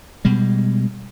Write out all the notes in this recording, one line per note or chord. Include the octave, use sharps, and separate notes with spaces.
B2 G3 G#3